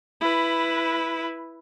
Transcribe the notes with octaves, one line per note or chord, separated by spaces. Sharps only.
E4 B4